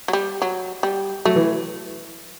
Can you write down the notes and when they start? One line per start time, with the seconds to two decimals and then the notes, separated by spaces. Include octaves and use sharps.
0.08 F#3
0.13 G3
0.42 F#3
0.83 G3
1.25 F#3 A3
1.35 E3